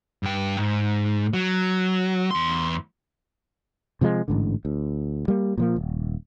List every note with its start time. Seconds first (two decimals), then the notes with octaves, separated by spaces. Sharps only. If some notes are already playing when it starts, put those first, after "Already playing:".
0.23 G2 G5
0.58 G#2
1.33 F#3
2.31 E2 C6
4.01 C3 F3 G3 G#3
4.28 A1 G#2 D3
4.65 D2
5.28 G3 A#3
5.58 A#2 F3 A#3
5.76 D#1